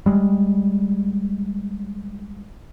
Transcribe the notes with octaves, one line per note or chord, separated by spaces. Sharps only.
G3 G#3